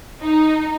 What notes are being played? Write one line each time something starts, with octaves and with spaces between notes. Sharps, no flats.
D#4